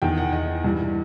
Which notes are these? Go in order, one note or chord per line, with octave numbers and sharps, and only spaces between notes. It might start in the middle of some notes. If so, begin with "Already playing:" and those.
E2 D#3 G5
F#5
D#5
G2 E3